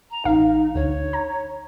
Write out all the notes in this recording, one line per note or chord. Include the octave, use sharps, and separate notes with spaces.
A#5
A1 D#4 F5
D2 C#5
A#5